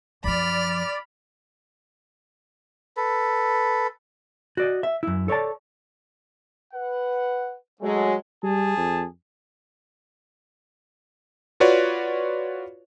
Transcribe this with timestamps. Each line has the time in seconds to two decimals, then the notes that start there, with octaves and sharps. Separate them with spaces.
0.24 F#2 F3 D5 B5 F6
2.97 A4 B4
4.57 F#4 D5 D#5
4.83 E5
5.03 F#2 E4
5.28 A4 C#5 D5 A5
6.74 B4 F#5
7.81 F#3 G#3 A3
8.43 G3 G#4 A5
8.77 F2
11.60 F4 F#4 B4 C#5 D5